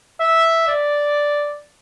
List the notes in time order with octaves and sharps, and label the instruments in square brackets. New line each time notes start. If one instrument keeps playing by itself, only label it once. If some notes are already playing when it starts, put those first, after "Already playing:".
[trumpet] E5
D5